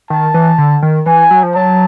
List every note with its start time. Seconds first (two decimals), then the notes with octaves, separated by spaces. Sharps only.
0.10 D#3 A5
0.34 E3
0.58 D3
0.83 D#3
1.06 E3 G#5
1.31 F#3
1.43 F3
1.55 F#3 A5